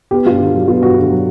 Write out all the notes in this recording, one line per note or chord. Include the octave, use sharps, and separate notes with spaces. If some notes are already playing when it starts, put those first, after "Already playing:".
B3 G4
G2 F4
D3
F#3
B3 F4
G2 F#4
D3
F#3